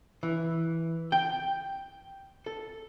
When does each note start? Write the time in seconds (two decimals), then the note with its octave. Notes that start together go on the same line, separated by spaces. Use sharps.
0.23 E3
1.12 G5
2.46 A4